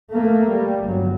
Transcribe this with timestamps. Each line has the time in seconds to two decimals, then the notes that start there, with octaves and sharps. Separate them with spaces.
0.11 A3 A#3
0.51 G3
0.84 G1 F#3